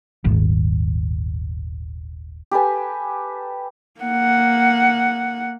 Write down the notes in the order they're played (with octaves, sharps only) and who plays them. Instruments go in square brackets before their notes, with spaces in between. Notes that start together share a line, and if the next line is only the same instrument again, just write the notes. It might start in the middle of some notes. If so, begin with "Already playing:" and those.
[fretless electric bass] D#1 G#1
[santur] G4 A4 B4 G#5
[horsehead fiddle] A#3 F#5